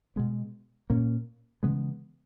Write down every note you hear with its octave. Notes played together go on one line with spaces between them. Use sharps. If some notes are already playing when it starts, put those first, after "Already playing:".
B2 G#3 B3
A#2 A#3 C#4
C#3 E3 G#3 B3